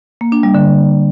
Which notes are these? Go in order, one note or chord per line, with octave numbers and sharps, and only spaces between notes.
A#3
D4
G3
D3